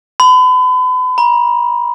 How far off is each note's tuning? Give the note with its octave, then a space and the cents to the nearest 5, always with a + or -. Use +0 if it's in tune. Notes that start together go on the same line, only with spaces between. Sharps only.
B5 +40
A#5 +45